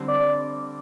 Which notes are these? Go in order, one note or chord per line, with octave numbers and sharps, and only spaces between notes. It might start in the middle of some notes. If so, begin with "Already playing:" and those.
Already playing: D3 G3 C4
D5